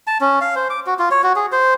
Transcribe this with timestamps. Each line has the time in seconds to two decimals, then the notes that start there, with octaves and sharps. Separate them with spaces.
0.07 A5
0.21 C#4
0.41 F5
0.56 C5
0.70 D6
0.86 F#4
0.99 F4
1.11 C#5
1.23 F#4
1.36 G#4
1.52 C5